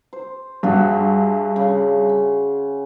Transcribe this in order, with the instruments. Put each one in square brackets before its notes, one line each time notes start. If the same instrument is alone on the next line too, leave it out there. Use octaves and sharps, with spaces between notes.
[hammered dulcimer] C5
[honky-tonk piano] G2 [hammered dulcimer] F#4 G#4 E5
[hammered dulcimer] C#3